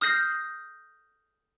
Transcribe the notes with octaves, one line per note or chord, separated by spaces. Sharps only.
D#6 F6 G6 A#6 C7